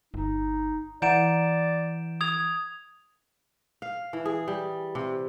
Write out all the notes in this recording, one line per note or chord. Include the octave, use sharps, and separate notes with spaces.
G1 D#4
E3 D5 F#5 A#5 G6 D7 E7
D#6 G#6 F7
F5
E3
G#4
G3
C3